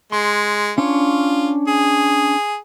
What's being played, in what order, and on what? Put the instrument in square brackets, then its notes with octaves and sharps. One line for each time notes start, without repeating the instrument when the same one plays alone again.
[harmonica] G#3 [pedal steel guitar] C6
[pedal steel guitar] C#4 D4 C#5 [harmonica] F4
[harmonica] G#4